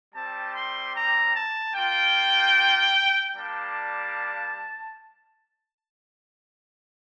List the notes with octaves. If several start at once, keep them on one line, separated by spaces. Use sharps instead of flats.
G3 C4 G4 A5
C6
A#5
A5
A#3 F4 G5
G3 A#3 D4 A5